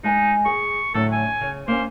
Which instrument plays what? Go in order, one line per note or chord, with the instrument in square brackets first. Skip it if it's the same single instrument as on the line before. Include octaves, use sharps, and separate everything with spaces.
[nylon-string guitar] G#3 G#5 [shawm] D#4
[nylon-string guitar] G#4 [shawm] C#6
[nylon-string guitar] A2 D3 F#3 [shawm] A4
[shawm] G#5
[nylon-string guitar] C#3
[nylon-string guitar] A#3 C#4 [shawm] C5